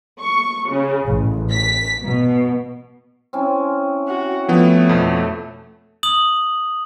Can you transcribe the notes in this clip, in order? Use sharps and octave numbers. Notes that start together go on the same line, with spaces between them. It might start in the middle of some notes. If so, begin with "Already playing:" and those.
C#6
C#3
A1
B6
B2
C4 C#4 E4
F#4
F3 A3 B3
F2 B2
D#6 F#7